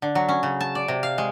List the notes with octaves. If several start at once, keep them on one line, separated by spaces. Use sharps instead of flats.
D3
F#3
C#4
C#3
A5
D5
C3
F5
G#3